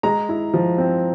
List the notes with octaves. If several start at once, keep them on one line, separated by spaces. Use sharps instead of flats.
G#3 A#5
E4
F3
C4